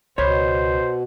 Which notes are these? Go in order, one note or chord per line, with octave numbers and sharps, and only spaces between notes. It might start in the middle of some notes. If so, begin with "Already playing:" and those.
C#2 B2 C5 C#5 B5